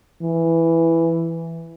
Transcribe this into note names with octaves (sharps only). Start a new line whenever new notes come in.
E3